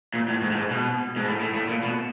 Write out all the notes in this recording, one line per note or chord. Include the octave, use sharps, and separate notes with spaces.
A#2
A2
G#2
A2
G#2
B2
G#2
A2
A2
A2
A#2
B2